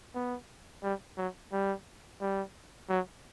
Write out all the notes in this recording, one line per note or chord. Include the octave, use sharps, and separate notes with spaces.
B3
G3
F#3
G3
G3
F#3